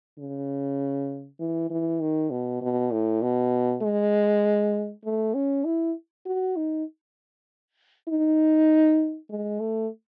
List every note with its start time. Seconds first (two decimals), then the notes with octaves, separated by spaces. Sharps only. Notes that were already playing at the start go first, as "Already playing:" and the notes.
0.19 C#3
1.40 E3
1.70 E3
2.01 D#3
2.31 B2
2.62 B2
2.92 A2
3.22 B2
3.83 G#3
5.05 A3
5.35 C#4
5.65 E4
6.26 F#4
6.56 D#4
8.08 D#4
9.30 G#3
9.60 A3